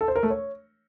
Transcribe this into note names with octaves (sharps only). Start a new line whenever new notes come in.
A4
C5
A#4
A3
C#5